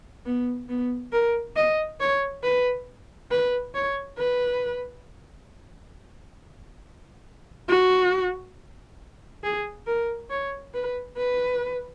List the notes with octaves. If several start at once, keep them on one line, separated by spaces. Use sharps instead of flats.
B3
B3
A#4
D#5
C#5
B4
B4
C#5
B4
F#4
G#4
A#4
C#5
B4
B4